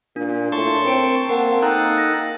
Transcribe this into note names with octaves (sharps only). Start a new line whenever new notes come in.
A#2 D4
A2 A5 C6 C#6
C4 A#4 G5 D7
A#3 C4 A#4 F#5 A5
D#4 A4 G5 A#5 F#6
A#6